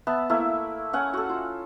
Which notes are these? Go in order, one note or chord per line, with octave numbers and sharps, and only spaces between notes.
B3 E5 A5
A3 A#3 E4 E5
C#4 F#5 G#5
F#4 A4
F4